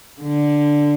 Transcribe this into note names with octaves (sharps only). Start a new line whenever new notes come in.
D3